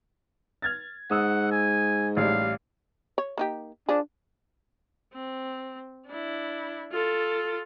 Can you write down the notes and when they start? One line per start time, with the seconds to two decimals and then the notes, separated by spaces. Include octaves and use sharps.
0.62 F6 G#6 A6
1.11 G#2 F#5 D#6 E6
1.51 G#5
2.17 A1 G3 F5
3.18 C#5
3.38 A#3 D#4 G4
3.89 F3 D4 G#4
5.14 C4
6.07 D4 E4
6.92 F4 A4